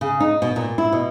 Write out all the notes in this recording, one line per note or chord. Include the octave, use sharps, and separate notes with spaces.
C#3
D#4
B2
A#2
E4
B2